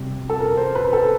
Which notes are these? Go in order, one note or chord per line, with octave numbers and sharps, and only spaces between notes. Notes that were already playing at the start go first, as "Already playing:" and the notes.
Already playing: C3 G3
A4
A#4
C5
B4
A4